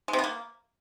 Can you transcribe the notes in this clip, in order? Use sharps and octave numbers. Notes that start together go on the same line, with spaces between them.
G#3
C3
B3
A#3